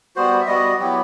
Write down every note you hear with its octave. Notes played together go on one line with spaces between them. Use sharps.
G3 B3 F#4 C5
E5
G3 B3 F#4 D#5
F#3 B3 E4 G4